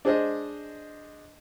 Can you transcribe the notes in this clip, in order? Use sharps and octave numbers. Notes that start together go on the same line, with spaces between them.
D4 G#4 C5 D#5